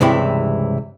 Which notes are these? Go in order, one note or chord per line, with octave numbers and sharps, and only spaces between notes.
C#2 G2 C3 E3 E4 B5